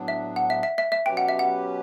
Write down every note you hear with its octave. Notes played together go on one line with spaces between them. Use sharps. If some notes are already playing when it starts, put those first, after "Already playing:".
Already playing: A2 F#3 B3 D4
E5
F#5
E5
E5
E5
E5
B2 F#3 C#4 G4 B4 G5
F#5
E5
F#5